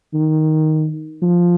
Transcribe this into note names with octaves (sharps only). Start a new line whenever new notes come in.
D#3
F3